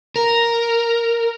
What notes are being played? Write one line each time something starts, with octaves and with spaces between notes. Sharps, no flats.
A#4